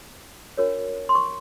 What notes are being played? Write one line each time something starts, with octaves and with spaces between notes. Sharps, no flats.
D4 F#4 A#4 C#5
C6
C#6